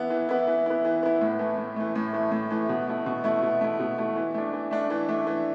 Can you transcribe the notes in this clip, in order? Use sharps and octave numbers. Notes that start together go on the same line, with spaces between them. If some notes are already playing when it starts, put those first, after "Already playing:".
Already playing: E3 B3 E4
E3
B3 E4
E3
B3 E4
E3
B3 E4
A2
E3 A3
A2
E3 A3
A2
E3 A3
A2
E3 A3
B2
A3 E4
B2
A3 E4
B2
A3 E4
B2
A3 E4
E3
A3 D4
E3
A3 D4
E3
A3 D4
E3